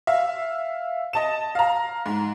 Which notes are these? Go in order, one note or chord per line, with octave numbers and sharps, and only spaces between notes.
E5 F5
D#5 A5 E7
F5 A#5
G#2